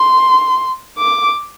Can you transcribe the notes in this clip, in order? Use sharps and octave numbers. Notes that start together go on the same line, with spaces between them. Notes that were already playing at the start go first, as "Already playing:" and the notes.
Already playing: C6
D6